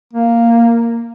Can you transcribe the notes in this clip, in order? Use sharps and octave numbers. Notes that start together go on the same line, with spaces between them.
A#3